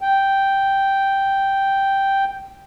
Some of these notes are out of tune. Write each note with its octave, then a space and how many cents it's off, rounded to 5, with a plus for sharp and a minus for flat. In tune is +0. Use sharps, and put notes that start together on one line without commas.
G5 -5